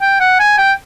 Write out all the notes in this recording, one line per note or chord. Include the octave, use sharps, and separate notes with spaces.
G5
F#5
G#5
G5